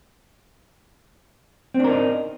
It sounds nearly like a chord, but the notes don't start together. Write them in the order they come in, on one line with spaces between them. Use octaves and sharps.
C4 D4 A#4 D#4